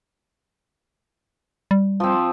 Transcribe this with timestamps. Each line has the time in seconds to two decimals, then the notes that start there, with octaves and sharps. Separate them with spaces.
1.71 G3
2.00 F3 C4